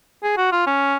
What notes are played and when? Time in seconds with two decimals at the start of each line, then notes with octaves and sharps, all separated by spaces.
0.24 G#4
0.37 F#4
0.52 F4
0.67 C#4